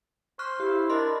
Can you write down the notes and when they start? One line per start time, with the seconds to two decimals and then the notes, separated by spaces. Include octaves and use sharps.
0.39 C5 C#6 F6 F#6
0.60 E4 G4
0.89 D4 A#4 D#5 B5 C6